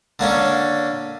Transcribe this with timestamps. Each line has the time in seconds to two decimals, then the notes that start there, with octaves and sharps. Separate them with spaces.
0.19 D3 A#3 C#4 D4